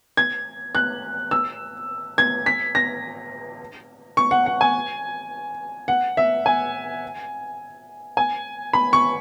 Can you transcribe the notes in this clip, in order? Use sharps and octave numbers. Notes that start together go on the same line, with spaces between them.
G#6
F#6
E6
G#6
B6
A#6
C#6
F#5
F#5
G#5
F#5
E5
G#5
G#5
B5
C#6